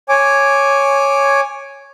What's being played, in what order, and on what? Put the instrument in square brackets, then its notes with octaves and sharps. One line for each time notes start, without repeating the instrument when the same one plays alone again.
[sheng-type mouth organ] C#5 G#5 D6